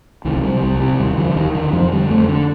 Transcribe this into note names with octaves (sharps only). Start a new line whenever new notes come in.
C2 D#3
F3
C3 G3
C2 G3
C3 G3
D#2 G3
D3 F3
D#2 D#3
D3 D#3
F2 F3
D3 G3
F2 A3
D3 D4